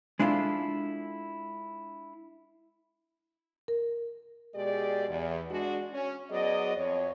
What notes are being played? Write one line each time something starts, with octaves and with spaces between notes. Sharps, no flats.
G#3 D4 E4 F4 A4
A#4
B2 G#3 G4 G#4 D5
E2
G#3 D4 F#4
C#4
F#3 B3 G#4 D5 D#5
F2 C#5